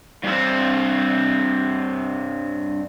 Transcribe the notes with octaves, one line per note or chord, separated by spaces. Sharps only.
G2 C4